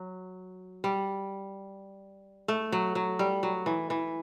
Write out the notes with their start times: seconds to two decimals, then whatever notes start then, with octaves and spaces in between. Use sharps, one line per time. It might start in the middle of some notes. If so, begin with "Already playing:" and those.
Already playing: F#3
0.84 G3
2.48 A3
2.72 F#3
2.95 F#3
3.19 G3
3.43 F#3
3.66 E3
3.90 E3